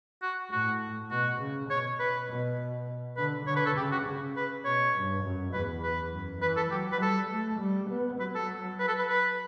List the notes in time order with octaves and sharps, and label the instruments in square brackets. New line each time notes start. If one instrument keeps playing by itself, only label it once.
[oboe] F#4
[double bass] A2 [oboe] F#4
[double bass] B2 [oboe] F#4
[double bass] C#3
[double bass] B2 [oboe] C#5
[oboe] B4
[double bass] B2
[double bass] D3 [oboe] B4
[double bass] D3 [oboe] C#5
[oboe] B4
A4
[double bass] C#3 [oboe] G4
[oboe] F#4
[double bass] C#3
[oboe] B4
[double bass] B2 [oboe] C#5
[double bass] G2
F#2
[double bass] E2 [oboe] B4
[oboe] B4
[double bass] F#2
[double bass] E3 [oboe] B4
[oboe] A4
[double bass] F#3 [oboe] G4
[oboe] B4
[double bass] G3 [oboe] A4
[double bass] A3
G3
B3
[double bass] F#3 [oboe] B4
[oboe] A4
B4
A4
B4
B4